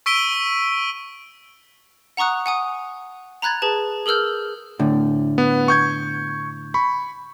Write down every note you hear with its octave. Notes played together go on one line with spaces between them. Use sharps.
C#6 E6 B6 D7 D#7 G7
F#5 A#5 C#6 D#6 F#6
F#5 G#5 D#6
A#5 B5 F#6 G#6 A6
G#4 B4 A5
G#4 A#4 E6 F6 G6
A2 D3
B3
C#6 G6 G#6
B5 C#6